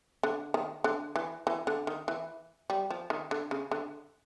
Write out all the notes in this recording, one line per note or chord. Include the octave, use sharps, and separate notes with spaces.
D3
D#3
D3
E3
E3
D3
D#3
E3
G3
F3
D#3
D3
C#3
D3